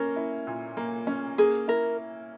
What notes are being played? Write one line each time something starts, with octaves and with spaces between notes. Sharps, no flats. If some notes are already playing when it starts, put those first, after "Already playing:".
Already playing: A#3 C#4 A#4
E4
A#2
A#3
C#4
A#3 G#4
E4 A#4